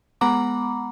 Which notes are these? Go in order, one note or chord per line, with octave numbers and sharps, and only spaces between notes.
G#3 B3 F#5 A#5 B5 D6